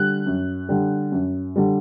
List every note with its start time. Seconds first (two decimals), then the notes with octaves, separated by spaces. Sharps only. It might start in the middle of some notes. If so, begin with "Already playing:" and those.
Already playing: D3 G3 F#6
0.26 F#2
0.69 D3 G3
1.12 F#2
1.56 D3 G3